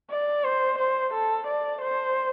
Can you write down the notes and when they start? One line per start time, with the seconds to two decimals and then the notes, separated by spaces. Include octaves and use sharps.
0.10 D5
0.44 C5
0.78 C5
1.14 A4
1.47 D5
1.82 C5